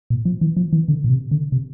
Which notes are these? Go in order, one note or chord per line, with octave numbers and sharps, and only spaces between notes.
A#2
F3
E3
F3
E3
D3
A#2
C3
D3
C3